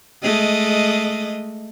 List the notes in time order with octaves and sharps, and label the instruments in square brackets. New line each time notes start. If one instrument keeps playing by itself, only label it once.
[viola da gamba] G#3 A3 D#5